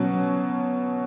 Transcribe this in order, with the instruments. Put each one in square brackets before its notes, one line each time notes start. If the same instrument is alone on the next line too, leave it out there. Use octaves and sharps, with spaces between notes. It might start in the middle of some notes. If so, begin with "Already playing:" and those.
Already playing: [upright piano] B2 F#3 C#4